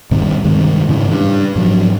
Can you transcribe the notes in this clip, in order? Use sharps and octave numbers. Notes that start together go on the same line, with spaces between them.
G2 C3 D#3
G2 D#3 G#3
G#2 C#3 E3
G2
G#2 F3 F#3